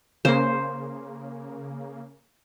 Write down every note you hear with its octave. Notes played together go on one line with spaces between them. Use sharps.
C#3 A#3 C5